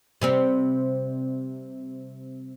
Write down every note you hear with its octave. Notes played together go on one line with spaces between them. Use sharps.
C3 G3 C4